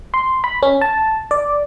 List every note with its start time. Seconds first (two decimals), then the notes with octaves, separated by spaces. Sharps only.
0.14 C6
0.44 B5
0.63 C#4
0.81 A5
1.31 D5